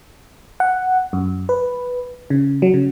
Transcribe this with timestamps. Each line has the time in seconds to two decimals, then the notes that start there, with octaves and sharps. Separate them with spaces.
0.60 F#5
1.13 F#2
1.49 B4
2.30 C#3
2.62 F#3
2.74 C#3